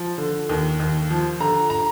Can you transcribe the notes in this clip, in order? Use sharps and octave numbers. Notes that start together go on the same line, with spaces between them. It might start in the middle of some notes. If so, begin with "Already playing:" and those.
Already playing: F3
D3
D#2
D#2
F3
D3 A#5
A#5